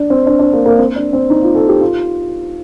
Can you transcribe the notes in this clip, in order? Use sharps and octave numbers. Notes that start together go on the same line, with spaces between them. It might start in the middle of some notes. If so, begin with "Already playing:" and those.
Already playing: D4
C4
D4
D4
A#3
A#3
C4
D4
C4
D#4
F4
A4
G4
F4